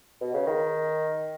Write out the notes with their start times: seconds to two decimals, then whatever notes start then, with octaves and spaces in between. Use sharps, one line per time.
0.21 B2
0.34 C#3
0.47 D#3